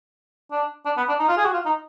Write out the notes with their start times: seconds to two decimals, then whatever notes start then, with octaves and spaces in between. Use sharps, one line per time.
0.51 D4
0.85 D4
0.97 B3
1.08 D4
1.19 D#4
1.28 F4
1.37 G#4
1.45 F#4
1.53 F4
1.65 D#4